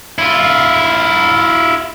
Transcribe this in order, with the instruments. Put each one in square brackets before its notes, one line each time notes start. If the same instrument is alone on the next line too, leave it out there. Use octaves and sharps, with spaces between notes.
[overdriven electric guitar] E4 F4